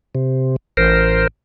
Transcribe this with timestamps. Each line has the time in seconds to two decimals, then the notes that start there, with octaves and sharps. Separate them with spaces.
0.15 C3
0.77 A1 A#4 C5